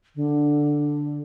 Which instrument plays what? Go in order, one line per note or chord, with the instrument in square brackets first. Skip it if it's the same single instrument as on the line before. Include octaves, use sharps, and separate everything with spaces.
[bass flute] D3